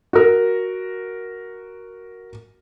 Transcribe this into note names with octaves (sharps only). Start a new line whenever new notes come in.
F#4 A#4